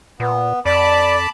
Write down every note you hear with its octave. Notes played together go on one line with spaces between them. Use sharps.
A#2 B3
F2 D5 A5 B5 D6